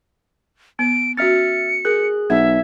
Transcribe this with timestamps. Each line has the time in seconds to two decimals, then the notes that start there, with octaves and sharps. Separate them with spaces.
0.79 B3 D7
1.17 C#4 F#4 E5 F6 A6 C#7
1.85 G#4 A#4 F#6
2.30 B1 E5 F#5 G#6